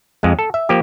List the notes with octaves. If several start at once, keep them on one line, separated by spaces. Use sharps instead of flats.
F2 G#3
A4
E5
F3 A#3 G4